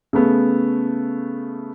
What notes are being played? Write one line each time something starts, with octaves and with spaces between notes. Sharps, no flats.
C#3 A3 B3